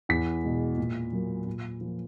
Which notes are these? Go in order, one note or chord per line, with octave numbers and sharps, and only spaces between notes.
E2 B6
B2 G#3
A#2
F#3 A#3
A#2
F3 A#3